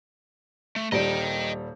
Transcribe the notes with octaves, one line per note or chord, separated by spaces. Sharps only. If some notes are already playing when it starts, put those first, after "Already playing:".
A3
D#1 G3 D4 D#5 G5